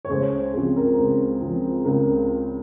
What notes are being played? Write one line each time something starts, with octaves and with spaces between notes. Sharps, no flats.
C#5
C#2 G#4 C5
C#3 F3 C4 G#4
A#4
C#2
C#3 F3 C4
C#2 A#4